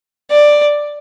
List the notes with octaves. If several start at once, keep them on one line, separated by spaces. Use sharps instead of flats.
D5